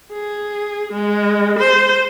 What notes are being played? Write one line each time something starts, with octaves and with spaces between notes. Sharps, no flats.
G#4
G#3
C5